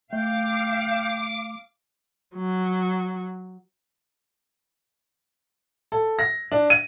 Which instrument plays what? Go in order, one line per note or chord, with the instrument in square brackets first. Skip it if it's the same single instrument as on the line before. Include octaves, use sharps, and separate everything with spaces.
[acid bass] A3 [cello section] F5 [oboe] G5 [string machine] D6
[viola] F#3
[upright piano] A4
A#6
D4
D#7